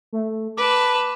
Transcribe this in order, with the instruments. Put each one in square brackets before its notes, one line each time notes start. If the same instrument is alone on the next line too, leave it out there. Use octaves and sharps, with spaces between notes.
[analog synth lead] A3
[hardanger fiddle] B4 A5 [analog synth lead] D6